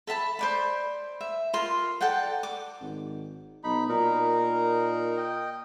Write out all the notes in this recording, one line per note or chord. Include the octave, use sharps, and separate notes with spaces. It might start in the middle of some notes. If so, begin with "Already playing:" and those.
A4 E5 A5 B5
C5 D5 B5
E5
F4 A#4 C6
A4 D5 F#5 G5
D6
G#1
B1 D#4 B5
A#2 D#4 A#4
D#5 G5